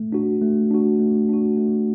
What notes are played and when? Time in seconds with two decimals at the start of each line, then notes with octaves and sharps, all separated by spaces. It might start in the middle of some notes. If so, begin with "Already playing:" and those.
Already playing: A3
0.12 D4 F#4
0.41 A3
0.71 D4 F#4
1.00 A3
1.29 D4 F#4
1.57 A3